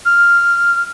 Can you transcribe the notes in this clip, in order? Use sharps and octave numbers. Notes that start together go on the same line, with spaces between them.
F6